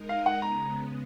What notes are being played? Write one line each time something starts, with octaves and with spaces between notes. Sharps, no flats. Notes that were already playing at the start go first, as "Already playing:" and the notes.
Already playing: G#3 D#4 A#4 D#5
F5
F#5
C#3 G#3 B3 A#5